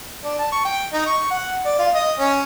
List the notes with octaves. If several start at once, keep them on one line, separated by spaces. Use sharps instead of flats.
D4
A5
C#6
G5
D#4
C#6
F#5
D5
F4
D#5
C#4